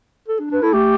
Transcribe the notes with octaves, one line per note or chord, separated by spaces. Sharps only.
A4
D4
D4 B4
E4 A4
A3 G4